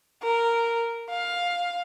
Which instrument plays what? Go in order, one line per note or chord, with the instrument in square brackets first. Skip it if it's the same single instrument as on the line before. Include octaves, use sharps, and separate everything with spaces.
[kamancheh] A#4
F5